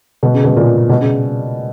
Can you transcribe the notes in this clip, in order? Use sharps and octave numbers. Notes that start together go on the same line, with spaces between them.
B2
C#3
B2
A#2
B2
C#3